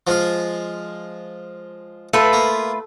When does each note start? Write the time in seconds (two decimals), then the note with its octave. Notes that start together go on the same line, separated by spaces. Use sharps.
0.07 F3 G#3 F4
2.13 A3 F4 A4 B4
2.33 A#3